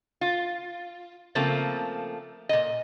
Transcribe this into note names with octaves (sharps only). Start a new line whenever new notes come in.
F4
C#3 F3 A3 A#3 C4
A#2 D#5